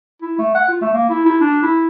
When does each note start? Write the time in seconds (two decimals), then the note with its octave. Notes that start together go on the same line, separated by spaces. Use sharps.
0.22 E4
0.38 A3
0.55 F#5
0.68 F4
0.81 A3
0.93 A#3
1.09 E4
1.25 E4
1.41 D4
1.62 E4